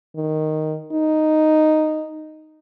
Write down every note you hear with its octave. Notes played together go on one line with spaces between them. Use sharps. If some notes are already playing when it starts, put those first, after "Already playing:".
D#3
D#4